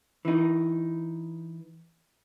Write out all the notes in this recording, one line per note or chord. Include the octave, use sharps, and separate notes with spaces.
E3 D#4